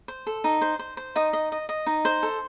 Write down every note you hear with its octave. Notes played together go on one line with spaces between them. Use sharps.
C5
A4
D#4
C5
C5
C5
D#4 D#5 D#6
D#5
D#5
D#5
D#4
C5
A4